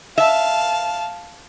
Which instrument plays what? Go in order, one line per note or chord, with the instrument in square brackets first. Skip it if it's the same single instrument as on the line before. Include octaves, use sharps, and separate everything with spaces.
[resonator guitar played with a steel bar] E5 [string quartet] F5 A5